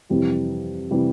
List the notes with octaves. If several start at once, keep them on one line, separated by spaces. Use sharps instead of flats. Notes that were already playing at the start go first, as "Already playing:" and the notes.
F2 C3 E3 G3
C3 E3 G3